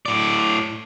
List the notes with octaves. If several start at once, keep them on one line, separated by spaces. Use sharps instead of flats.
A2 D5